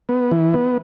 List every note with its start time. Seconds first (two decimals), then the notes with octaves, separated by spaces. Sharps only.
0.09 B3
0.31 E3
0.54 B3